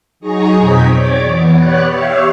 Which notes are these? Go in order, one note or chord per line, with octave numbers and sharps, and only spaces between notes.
F#3 D#4 G#4 D#5 A#5 C#6
F2 B2 C4 G5 G#6 B6
C#5 D5 D6
E3 B3
B3 G4 B4 C#5 D5 F#6
G4 C#5 E5 F5